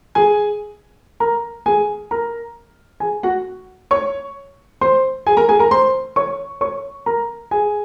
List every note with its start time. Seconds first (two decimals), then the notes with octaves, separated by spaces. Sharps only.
0.15 G#4 G#5
1.20 A#4 A#5
1.66 G#4 G#5
2.11 A#4 A#5
3.00 G#4 G#5
3.23 F#4 F#5
3.91 C#5 C#6
4.81 C5 C6
5.27 G#4 G#5
5.37 A#4 A#5
5.49 G#4 G#5
5.59 A#4 A#5
5.71 C5 C6
6.16 C#5 C#6
6.61 C#5 C#6
7.06 A#4 A#5
7.51 G#4 G#5